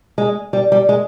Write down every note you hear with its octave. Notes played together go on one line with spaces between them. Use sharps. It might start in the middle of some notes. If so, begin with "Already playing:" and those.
G#3
G3
G3
G#3